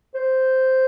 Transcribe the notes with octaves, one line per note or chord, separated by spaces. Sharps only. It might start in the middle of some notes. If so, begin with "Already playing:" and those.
C5